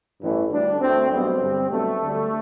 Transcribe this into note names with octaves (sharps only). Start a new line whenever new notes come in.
A1 G2 E3 A3
D2 D3 G3 D4
D2 D3 A3 C4
B1 B2 G3 C4
G2 D3 G3
B1 B2 G3 A3
D2 D3 G3